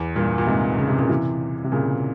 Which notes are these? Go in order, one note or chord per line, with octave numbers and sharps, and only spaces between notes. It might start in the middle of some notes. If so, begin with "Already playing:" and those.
Already playing: E2
G2 A#2
A#2
G#2 C3
C#3
C3
A#2 C#3
C3 E3
C3
A#2 C#3